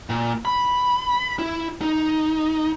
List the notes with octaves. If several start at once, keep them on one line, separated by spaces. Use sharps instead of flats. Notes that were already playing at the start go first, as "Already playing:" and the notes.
A#2
B5
E4
D#4